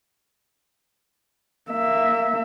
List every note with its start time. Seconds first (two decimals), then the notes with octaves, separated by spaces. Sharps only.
1.71 A#3 E5